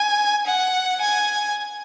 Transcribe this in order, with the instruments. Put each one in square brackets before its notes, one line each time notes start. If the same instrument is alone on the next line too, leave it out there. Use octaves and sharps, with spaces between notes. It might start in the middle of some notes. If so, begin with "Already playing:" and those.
Already playing: [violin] G#5
F#5
G#5